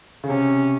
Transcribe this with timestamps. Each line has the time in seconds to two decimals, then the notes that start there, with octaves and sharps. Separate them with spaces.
0.24 C#3
0.29 C3 C#4